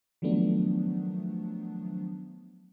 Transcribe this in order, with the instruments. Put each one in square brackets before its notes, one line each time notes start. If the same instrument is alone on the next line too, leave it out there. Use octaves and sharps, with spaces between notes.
[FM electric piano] D#3 F3 F#3 A3 B3 D4